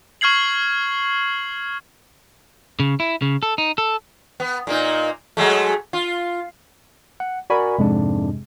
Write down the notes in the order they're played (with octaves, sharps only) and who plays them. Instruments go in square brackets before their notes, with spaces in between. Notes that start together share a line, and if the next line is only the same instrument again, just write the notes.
[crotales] C#6 F6 G#6 C7 F#7
[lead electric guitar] C#3
E4
C#3
A4
D#4
A4
[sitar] B3
A#2 A#3 D#4
F#3 G#3 A3
F4
[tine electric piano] F#5
[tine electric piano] F#4 A#4 [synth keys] D5 G#5 B5
[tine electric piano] F2 G#2 D4 [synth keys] C3 G#3